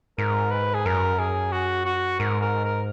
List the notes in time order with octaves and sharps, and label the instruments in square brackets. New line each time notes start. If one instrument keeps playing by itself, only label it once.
[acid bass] G#2 [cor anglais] A#4
[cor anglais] B4
G#4
[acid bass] F#2 [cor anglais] A#4
[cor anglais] G#4
F#4
F#4
[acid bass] G#2 [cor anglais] A#4
[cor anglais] A#4
A#4